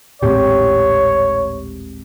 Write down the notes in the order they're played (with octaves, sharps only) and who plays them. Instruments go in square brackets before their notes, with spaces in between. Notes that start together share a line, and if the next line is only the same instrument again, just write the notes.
[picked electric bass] D#1 A1 A2 [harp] G#3 C4 G4 [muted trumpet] C#5